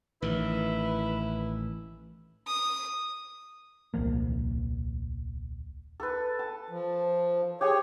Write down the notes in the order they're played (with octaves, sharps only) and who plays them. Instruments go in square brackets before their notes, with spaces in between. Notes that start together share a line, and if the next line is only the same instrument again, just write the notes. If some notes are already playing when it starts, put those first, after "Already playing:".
[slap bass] A1 D#3 [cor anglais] E4 [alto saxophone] B4
[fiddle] D#6
[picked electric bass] D#1 C2 F3 A#3
[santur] A4 B4
A5
[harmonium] F3
[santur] G4 G#4 G#5 [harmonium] C#5